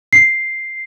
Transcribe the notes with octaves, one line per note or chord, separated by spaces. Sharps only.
C7